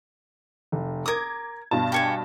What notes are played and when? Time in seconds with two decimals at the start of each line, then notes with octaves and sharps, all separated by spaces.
0.72 F1
1.06 A#4 D6 D#6 G#6
1.71 G2 B2 A5
1.92 G4 C#5 G#5